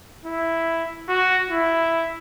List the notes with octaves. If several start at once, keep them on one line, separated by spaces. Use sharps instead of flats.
E4
F#4
E4